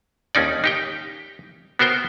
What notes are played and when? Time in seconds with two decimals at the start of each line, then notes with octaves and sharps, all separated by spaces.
0.35 D#2 C#4 D#4 D5
0.64 D#4 G4 G5
1.79 B3 F#4 A#4 C5 G5